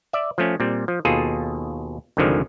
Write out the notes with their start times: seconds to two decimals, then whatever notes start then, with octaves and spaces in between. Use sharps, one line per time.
0.13 D5 E5
0.38 F3 A3 C#4
0.60 A#2 G3 C4
0.88 F3
1.05 D#2 B2 F4 G#4 A4
2.17 C2 G2 D3 D#3 F3 G#3